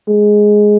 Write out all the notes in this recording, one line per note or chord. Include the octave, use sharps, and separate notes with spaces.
G#3